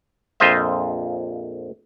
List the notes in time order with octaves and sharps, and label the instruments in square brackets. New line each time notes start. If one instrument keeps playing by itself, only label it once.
[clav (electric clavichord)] A#1 F2 F4 C5 D#5 E5